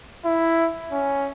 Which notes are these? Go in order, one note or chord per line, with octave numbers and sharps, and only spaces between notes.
E4
C#4